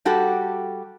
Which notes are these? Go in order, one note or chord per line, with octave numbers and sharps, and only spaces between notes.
G3 F#4 G4 A4